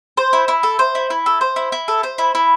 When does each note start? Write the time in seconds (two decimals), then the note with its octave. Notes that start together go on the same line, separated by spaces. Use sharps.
0.17 C5
0.33 E4
0.48 E4
0.63 A4
0.79 C5
0.95 E4
1.10 E4
1.26 A4
1.41 C5
1.56 E4
1.72 E4
1.88 A4
2.03 C5
2.18 E4
2.35 E4